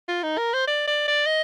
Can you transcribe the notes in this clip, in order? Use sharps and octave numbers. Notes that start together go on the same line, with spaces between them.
F4
D#4
A#4
C5
D5
D5
D5
D#5